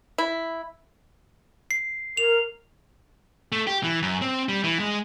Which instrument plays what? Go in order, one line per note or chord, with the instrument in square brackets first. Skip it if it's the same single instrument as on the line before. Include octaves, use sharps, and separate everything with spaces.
[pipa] E4
[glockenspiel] C7
[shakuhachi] A#4 [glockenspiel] F7
[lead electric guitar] A3
G4
E3
F#2
C4
G3
E3
G#3